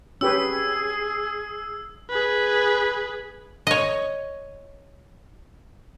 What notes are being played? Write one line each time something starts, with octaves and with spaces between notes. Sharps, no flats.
C#4 G4 G#4 B4 E6
G#4 B4
C#5 D#5